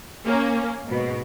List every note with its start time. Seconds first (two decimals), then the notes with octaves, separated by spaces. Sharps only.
0.25 A#3 C#4
0.86 G#2 B2